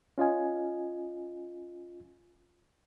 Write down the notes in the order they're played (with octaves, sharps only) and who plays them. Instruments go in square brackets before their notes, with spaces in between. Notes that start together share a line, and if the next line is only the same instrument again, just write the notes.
[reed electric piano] C#4 F4 D#5 G#5